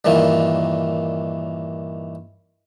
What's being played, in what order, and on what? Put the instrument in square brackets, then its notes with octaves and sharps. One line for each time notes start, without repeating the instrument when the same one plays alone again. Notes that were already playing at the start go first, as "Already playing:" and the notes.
[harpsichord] G2 A#2 D#3 E3